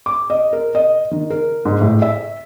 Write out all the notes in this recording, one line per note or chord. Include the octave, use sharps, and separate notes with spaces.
D6
D#5
A#4
D#5
D#3
A#4
G#2
A2
E5